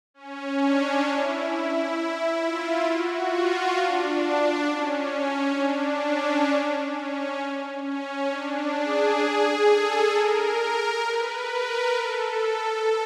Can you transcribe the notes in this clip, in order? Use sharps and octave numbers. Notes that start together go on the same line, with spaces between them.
C#4
D4
E4
E4
F4
F#4
F4
D4
C#4
D4
C#4
C#4
C#4
D4
G#4
A4
A#4
B4
A#4
A4